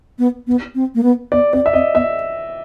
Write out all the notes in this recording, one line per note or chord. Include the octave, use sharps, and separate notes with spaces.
B3
B3
C4
A#3
B3
B3 D5
C4 D5
E5
C4 D#5
B3 E5